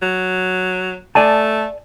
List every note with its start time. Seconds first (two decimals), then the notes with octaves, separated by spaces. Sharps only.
0.02 F#3
1.15 A3 D5 G#5 A5